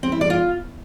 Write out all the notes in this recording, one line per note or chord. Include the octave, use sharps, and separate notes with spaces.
C4
E4
D5
F4